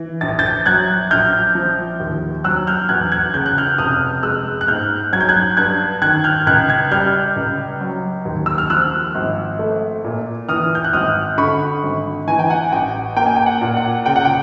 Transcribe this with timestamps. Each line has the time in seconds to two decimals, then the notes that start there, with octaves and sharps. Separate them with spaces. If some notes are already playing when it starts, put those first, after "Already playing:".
Already playing: E3
0.21 A#1 A6
0.39 G6 A6
0.66 F#3 F#6 G#6
1.11 A#1 F6 G6
1.55 F3
2.00 D#2
2.44 F#3 E6 F#6
2.67 F6 G6
2.89 E2 F#6 G#6
3.12 F#6 G#6
3.34 C#3 G6
3.46 F#6
3.58 F6 G6
3.78 F1 D#6 F6
4.23 G#3 E6 F#6
4.61 F#6
4.67 G#2 F6 G6
5.13 F#3 G#6
5.20 G6
5.29 F#6 G#6
5.57 G2 F#6 G#6
6.02 D#3 F#6 G#6
6.24 F6 G6
6.47 C#2 F#6 G#6
6.69 F#6 G#6
6.91 G3 F6 G6
7.36 C#2
7.81 F#3
8.25 D#2
8.46 E6
8.58 F6
8.70 F3 E6 F#6
9.15 G#1
9.59 A3
10.04 A#2
10.49 E3 D#6 F6
10.75 G6
10.84 F#6
10.93 G#1 D#6 F6
11.38 D3 B5 C#6
11.83 G#1
12.27 E3 G#5
12.39 G5
12.50 F#5 G#5
12.72 A1 G5
13.16 A#3 G5
13.26 G#5
13.36 G5
13.46 F#5
13.61 A#2
13.77 F#5
14.06 C#3 G5
14.16 F#5
14.25 G5